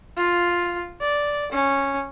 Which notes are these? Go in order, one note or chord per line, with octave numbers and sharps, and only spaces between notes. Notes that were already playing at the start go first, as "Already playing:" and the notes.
F4
D5
C#4